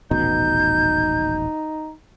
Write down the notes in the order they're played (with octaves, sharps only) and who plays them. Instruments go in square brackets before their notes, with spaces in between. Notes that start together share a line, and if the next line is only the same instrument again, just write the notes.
[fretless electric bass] D#1 A1 B2 [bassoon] D#4 [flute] G6